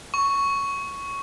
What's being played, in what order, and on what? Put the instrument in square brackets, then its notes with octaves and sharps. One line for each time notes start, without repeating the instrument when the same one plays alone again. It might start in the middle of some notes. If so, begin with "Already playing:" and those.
[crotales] C#6